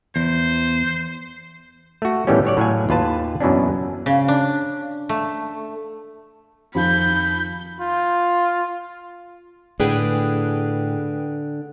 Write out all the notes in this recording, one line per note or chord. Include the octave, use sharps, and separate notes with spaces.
E2 C5
A3 F#4
A2 D#3 E3 G3 B3 C#4
F#3 C#5 D5
A2 F#3 F5 G#5
D#2 F4 B4 A5
F#2 B2 E3 C#4 D4
C#3
D4
A3
F2 D#3 F3 B5 G6
F4
A2 D3 G#4 B4 G5